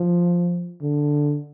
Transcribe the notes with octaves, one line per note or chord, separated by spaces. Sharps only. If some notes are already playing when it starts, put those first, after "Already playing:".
Already playing: F3
D3